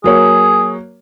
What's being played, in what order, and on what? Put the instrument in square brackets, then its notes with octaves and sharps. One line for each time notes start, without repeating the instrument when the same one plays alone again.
[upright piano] F#3 A#3 C#5 [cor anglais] G#4